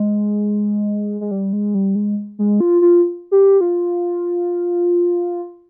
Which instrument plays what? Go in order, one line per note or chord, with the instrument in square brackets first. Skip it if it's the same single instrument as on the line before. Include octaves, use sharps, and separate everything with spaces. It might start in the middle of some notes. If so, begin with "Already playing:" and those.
Already playing: [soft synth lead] G#3
G#3
G3
G#3
G3
G#3
G#3
F4
F4
G4
F4